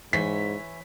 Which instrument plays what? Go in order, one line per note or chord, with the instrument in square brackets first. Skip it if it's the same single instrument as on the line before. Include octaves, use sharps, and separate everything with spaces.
[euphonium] G#2 [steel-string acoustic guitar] E3 C#5 [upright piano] B6